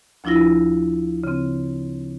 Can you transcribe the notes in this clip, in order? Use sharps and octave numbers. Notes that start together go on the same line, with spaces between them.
D2 F3 D4 E4 F4 A#6
C#3 C4